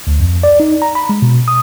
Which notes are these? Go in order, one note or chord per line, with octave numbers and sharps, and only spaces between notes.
D2
F2
D5
D#4
A#5
B5
G#3
B2
D#6